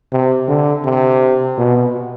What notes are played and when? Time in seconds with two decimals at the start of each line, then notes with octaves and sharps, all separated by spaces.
0.12 C3
0.49 D3
0.85 C3
1.58 B2